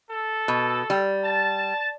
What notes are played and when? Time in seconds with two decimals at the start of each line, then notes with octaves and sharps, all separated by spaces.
0.10 A4
0.48 B2
0.90 G3
1.23 A5